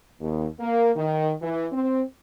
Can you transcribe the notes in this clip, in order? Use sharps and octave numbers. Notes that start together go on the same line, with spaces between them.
D#2
A#3
D#3
E3
C4